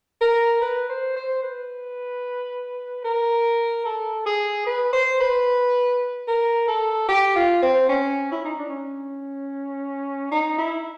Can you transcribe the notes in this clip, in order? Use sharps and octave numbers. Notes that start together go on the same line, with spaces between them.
A#4
B4
C5
C5
B4
A#4
A4
G#4
B4
C5
B4
A#4
A4
G4
F4
C4
C#4
E4
D#4
D4
C#4
D#4
E4